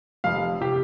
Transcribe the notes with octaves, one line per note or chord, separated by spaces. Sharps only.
F1 F2 C3 F5
C3 G4